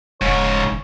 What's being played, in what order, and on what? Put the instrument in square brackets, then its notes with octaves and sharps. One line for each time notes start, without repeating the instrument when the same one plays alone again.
[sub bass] E1 [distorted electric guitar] G#2 C#3 [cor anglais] C#5